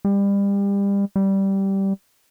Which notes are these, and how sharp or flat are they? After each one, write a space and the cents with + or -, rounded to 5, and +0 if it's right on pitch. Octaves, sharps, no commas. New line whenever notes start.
G3 +30
G3 -10